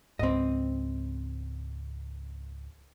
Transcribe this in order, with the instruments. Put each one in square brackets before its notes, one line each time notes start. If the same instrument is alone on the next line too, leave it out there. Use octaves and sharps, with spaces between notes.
[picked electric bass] C#2 G#2 [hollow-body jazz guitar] C4 D#5